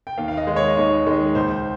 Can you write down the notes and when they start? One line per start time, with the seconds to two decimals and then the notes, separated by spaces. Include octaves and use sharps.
0.07 G5
0.18 D#2 F5
0.28 F5
0.37 D#5
0.47 D#3 G#3
0.56 C#5
0.68 D#5
0.77 D#2 C#5
1.07 D#3 G#3
1.35 C#2 C5